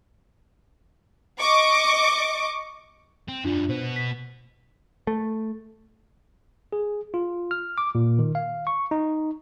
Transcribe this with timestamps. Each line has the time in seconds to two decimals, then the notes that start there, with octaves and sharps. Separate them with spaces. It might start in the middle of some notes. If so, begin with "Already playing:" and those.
1.39 D#5 C#6 D6
3.28 C4
3.44 F#2 G3 D4 F4
3.69 B2 B3 C5
3.96 B6
5.07 A3
6.73 G#4
7.14 F4
7.51 F6
7.78 D6
7.95 A#2
8.19 D#3
8.35 F5
8.67 C#6
8.91 D#4